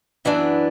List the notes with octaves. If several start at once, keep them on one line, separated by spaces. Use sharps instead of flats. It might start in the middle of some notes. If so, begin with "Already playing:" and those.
F#2 E3 B3 D4 E5